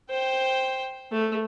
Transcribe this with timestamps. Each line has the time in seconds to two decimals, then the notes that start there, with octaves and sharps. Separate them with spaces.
0.10 C5 G5
1.12 A3